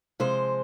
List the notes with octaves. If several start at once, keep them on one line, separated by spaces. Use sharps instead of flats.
C3 F3 G#3 C5